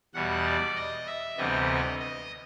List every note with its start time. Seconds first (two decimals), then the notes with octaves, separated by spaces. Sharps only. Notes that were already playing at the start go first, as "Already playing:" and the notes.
0.14 E2 B2 G3 F#5
0.45 D5
0.76 D#5
1.07 E5
1.38 D2 C3 E3 G3 B3 D#5
2.00 D#5